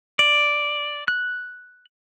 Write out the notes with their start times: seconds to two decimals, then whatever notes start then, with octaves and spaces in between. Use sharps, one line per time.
0.19 D5
1.08 F#6